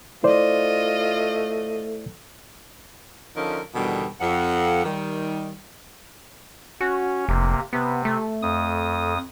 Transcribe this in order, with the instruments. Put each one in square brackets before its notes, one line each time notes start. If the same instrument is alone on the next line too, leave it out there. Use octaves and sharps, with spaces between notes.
[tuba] A3 [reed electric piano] E4 C5 D5 [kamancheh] F4 D#5
[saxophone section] D3 F3 C#4 D#4 A4 A#4
E2 B2 D3 D#3 G3
F2 F#5
D#3 G3
[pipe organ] C#4 [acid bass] F#4
[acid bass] F1 [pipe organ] C3 A#3
[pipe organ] C3 [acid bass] B3
[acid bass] A3
[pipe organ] F2 D#6